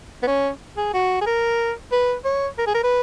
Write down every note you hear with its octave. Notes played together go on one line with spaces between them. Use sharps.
B3
C#4
G#4
F#4
G#4
A#4
B4
C#5
A#4
G#4
A#4
B4